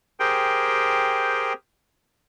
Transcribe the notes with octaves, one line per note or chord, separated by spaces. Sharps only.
G4 G#4 A#4 C5 G5